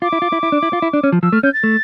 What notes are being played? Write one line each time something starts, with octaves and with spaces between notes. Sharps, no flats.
F4 D6
E4
F4
E4
E4
D4
E4
F4
E4
D4
C#4
F3
F3 E6
A3 F6
C#4 G6
A6
A3